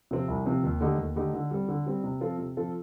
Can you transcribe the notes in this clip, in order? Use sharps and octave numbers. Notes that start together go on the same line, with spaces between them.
C3 F3 C4
C2
C3 F3 C4
D#2
D3 A3 D#4 G4
D#2
D3 A3 D#4 G4
D3
G3 C4
D3
G3 C4
C3
F3 C4 F4 A4
C3
F3 C4 F4 A4